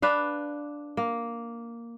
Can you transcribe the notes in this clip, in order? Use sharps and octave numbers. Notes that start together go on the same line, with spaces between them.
D4 B4 F5
A#3